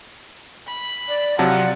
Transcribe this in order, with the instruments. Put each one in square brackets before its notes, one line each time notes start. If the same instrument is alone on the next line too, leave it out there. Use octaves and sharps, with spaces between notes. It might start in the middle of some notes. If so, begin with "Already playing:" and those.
[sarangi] B5
[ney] D5
[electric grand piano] C3 F#3 A5 [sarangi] F3 [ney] D5 [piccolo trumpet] F#5